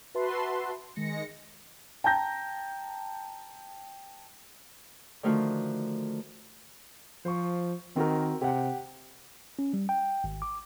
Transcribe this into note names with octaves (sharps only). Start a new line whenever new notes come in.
F#4 B4 E5 A5 C6
D#3 G#3 A#6 C#7
G5 A5 A#5 G6 A#6
D3 D#3 F3 A3 F4 F#4
F3 C5 C#6
D#3 C4 F#4 A#4
C3 G4 F#5
C#4
G3
G5
G#1
D6